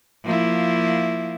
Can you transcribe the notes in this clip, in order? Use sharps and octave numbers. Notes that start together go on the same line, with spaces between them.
F3 A#3 E4